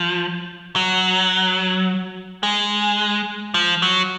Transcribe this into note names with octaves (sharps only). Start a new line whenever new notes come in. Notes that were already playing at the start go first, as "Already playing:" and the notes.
Already playing: F3
F#3
G#3
F3
F#3